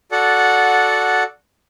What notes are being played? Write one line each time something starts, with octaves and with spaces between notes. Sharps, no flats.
F#4 A4 D5 F#5